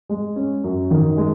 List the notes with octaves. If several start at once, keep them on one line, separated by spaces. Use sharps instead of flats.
G#3
C#4
F#2
D#3
G#3